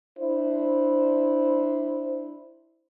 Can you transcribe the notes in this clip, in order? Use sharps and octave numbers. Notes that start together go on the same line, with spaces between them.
D4 E4 C5